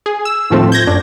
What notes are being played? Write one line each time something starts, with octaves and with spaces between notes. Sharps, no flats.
G#4
E6
D#2 A2 F3 A3 C4
G6 G#6 A#6
F#2 D4